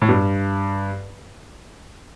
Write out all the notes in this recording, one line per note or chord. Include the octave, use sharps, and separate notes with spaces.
A2
G2